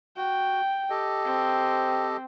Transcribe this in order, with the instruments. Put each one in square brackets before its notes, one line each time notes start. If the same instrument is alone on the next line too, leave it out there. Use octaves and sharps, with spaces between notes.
[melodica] F#4 [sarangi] G5
[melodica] G4 A4 D#5
[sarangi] C4